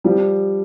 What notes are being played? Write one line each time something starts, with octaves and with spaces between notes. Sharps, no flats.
F3 G3